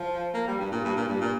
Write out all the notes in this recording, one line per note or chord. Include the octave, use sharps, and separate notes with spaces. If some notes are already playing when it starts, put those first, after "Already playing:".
Already playing: F3
A#3
G3
G2
A#2
G2
A#2
G2
A#2